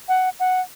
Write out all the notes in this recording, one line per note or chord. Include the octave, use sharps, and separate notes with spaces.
F#5
F#5